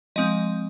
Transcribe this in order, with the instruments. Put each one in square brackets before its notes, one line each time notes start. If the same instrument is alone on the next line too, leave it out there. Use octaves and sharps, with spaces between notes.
[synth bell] F3 G#3 C4 D#5